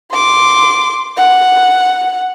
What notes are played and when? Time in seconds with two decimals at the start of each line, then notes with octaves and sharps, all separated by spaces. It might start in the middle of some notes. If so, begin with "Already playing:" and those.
0.12 C6 D6
1.17 F#5